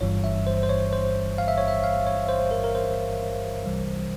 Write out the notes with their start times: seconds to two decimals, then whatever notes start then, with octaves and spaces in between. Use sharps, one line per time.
0.01 G1 G2 E3 G3 C#5
0.24 E5
0.47 C5
0.63 C5
0.69 C#5
0.93 C5
1.38 F5
1.48 E5
1.58 C#5
1.68 E5
1.84 F5
2.07 C#5
2.29 C5
2.51 A#4
2.64 A#4
2.75 C5
3.66 C2 C3 E3 G3